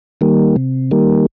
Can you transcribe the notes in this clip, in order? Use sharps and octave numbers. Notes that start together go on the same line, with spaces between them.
D#3 G3 A#3
C3
D#3 G3 A#3